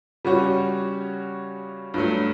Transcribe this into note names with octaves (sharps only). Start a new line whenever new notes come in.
C#3 G3 C#4 F#4 C#5
G2 F#3 A3